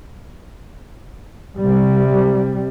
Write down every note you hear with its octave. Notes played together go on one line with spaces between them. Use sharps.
C3 G3